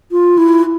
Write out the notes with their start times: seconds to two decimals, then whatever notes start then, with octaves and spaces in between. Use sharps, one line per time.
0.12 F4
0.38 E4